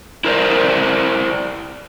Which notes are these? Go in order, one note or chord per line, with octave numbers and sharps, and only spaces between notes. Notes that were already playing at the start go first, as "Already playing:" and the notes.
E4 A#4 C5 D5